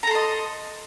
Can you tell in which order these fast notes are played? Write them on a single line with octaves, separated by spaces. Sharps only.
A#5 A4 C6 D#5